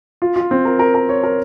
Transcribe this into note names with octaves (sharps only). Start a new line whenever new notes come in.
F4
F4
C4
A#4
A#4
A#4
C#5
A#4